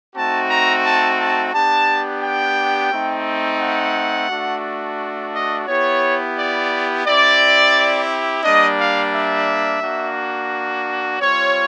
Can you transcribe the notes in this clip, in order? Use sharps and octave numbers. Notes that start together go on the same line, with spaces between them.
A3 C4 D#4 F#4 A5
A#5
A5
A5
B3 D4 G4 A5
G5
A3 C4 D#4
F#5
A3 D4 F#4
D#5
B3 E4 G4 C#5
D5
C4 E4 G4 D5
G3 A#3 D4 D#5
F5
E5
A#3 D4 F#4
G3 C4 F4 C#5